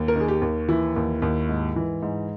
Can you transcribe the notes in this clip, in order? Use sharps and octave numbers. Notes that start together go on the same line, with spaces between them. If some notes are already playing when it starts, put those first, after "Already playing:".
Already playing: D#2
A#4
D#3 G#4
G4
D#2
E3 E4
D#2
D#2
G#2
E3
G#2